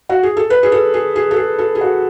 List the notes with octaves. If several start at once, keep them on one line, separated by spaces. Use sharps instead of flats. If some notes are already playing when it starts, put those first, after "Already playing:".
F#4
G#4
A4
B4
G#4
A4
G#4
G#4
A4
G#4
A4
G#4
F#4